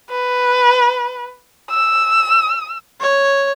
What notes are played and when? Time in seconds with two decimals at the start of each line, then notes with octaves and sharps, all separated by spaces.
0.10 B4
1.70 E6
3.00 C#5